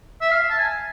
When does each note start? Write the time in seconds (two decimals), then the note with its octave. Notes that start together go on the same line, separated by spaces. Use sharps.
0.21 E5
0.31 F5
0.50 A5
0.58 G#5